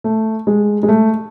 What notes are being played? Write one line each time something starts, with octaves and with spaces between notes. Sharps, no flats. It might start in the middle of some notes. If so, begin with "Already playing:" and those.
A3
G#3
G#3
A3